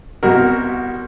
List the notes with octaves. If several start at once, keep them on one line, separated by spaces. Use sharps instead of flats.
C2 B2 F#4 A#4